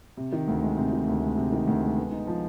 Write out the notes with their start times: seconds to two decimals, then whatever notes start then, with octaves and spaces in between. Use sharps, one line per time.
0.17 C3
0.32 D#3
0.48 D2
0.63 G#3
0.77 C3
0.92 D#3
1.08 D2
1.22 G#3
1.37 C3
1.52 D#3
1.67 D2
1.82 G#3
1.97 B3
2.12 D#4
2.27 F3